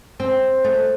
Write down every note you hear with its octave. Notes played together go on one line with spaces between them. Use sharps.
C4
A3